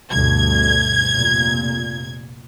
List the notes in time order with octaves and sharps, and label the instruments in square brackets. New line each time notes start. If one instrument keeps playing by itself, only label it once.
[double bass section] D2 G2 B2 [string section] G#6
[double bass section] F1 A#2